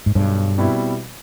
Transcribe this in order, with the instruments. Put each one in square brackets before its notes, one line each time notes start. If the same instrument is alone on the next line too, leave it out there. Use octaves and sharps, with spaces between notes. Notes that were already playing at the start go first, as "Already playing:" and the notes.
[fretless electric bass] G#2
[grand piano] B1 [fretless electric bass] G2
[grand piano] B2 G3 C4 E4